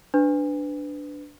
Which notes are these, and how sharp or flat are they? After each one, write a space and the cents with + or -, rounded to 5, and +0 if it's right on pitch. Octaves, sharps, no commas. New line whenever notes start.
D4 +0 B4 +20